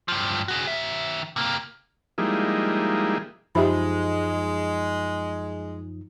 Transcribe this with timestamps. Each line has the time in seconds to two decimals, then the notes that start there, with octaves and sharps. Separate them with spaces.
0.08 G2 F3
0.48 F#4 G#4
0.67 D#3 E5
1.36 C3 A#3
2.18 F3 G3 G#3 A#3 D#4 E4
3.55 F#2 F3 G#3 D#4 G4 E5 B5